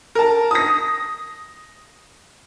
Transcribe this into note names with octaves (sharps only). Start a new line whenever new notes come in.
A#4 A5
D#6 A#6